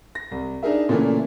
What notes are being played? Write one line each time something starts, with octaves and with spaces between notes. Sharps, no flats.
A#6
C2
D4 D#4 G#4 A#4 E5
A#2 C#3 E3 A3 A#4